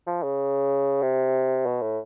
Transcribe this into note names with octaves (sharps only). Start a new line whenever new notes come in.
F3
C#3
C3
B2
A2